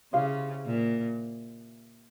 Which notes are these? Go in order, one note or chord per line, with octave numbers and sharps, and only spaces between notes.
C#3 E4 G4 C5 F5
A#2